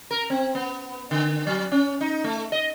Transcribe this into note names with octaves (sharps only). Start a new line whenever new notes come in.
A#4
C4
B3
D3
F#3
C#4
D#4
A3
D#5